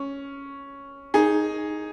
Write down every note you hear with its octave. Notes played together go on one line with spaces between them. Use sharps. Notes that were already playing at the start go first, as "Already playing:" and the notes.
Already playing: C#4
D#4 G#4